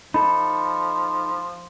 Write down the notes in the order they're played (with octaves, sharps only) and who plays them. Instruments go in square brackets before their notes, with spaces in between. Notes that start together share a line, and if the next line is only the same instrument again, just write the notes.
[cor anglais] F3 [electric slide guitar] D#4 A4 [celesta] B5